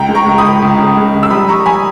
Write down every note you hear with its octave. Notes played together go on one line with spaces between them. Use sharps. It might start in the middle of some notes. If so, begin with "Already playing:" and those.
Already playing: C#2 G5 A#5
G#3
A#5 C#6
C#2
B5 D#6
C#2
C#2
C#3
G#3
C#2
E6
G3 B5 D#6
G3 A#5 C#6
G3 G#5 B5